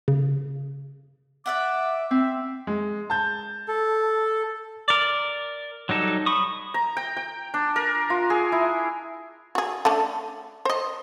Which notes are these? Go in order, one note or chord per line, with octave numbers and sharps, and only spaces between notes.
C#3
D5 E5 F#5 D6
C4 E5
G#3
A5 G6
A4
A#4 D5
F#3 G3 D#4 A4
B5 C#6 D#6
A#5
G5
G5
D4
A#4
F4
G#4
E4
F#4 G#4
A3 C#4 D4
C5 D#5